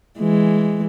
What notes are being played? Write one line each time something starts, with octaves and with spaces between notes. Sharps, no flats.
E3 G#3